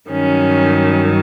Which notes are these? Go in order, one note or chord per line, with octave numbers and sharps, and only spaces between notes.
G2 D#3 F#3 C#4